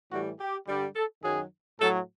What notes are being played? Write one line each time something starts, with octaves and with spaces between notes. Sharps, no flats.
A2 E3 G3 F#4
G4
G2 D3 G3
A4
F#2 D#3 F#3 G#4
A2 F#3 A4